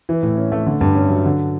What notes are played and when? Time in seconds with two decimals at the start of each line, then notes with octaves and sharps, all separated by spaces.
0.09 E3
0.23 A2
0.37 C#4
0.52 A3
0.66 D3
0.81 G2
0.95 C#4
1.10 F#3
1.25 D3